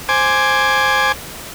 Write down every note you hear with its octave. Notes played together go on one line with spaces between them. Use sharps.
C5 G#5 D6